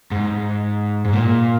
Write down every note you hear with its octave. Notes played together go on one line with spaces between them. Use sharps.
G#2
G#2
A#2